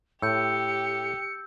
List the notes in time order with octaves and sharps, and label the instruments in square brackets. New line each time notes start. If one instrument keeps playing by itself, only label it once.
[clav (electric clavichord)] A2 [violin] G4 [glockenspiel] E6 G6 [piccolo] C#7